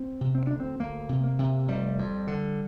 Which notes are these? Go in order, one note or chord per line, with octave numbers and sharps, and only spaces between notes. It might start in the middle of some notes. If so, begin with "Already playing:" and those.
Already playing: C4
C3
C4
D2 D4
C4
D2 A#3
C3
A#3
C3
F1 G3
F2
D3